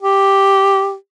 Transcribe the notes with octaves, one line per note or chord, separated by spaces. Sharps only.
G4